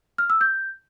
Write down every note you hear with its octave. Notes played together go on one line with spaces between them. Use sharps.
F6
E6
G6